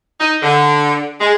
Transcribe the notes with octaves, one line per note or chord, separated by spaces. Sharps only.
D#4
D3
G#3